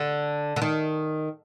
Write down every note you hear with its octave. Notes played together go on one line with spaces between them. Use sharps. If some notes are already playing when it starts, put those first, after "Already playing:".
Already playing: D3
D3
D#3